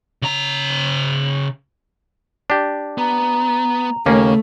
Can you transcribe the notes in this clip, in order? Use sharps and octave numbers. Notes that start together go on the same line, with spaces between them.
C#3 A#5
D4 G4
B3 A#5
D#2 C#3 A3 A#3 C#4